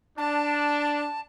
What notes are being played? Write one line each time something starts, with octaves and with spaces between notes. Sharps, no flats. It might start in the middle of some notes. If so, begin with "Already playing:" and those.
D4 A5